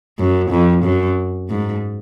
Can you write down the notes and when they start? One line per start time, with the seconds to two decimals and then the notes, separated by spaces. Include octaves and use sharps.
0.19 F#2
0.51 F2
0.84 F#2
1.49 G#2